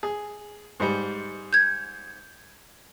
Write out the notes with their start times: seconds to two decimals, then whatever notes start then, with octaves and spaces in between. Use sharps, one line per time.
0.03 G#4
0.80 G#2 G3
1.53 G6 G#6